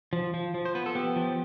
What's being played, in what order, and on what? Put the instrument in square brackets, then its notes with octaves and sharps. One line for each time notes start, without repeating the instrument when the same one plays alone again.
[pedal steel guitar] F3
F3
F3
C5
B3 B4
A4
B3 G4
F3